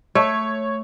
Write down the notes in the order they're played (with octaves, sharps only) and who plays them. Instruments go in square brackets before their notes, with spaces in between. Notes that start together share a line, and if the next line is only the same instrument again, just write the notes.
[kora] A3 [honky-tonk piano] C#5